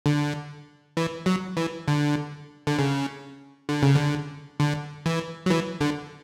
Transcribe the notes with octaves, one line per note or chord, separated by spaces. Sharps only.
D3
E3
F#3
E3
D3
D3
C#3
D3
C#3
D3
D3
E3
F#3
E3
D3